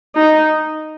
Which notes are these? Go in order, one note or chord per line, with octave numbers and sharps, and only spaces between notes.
D#4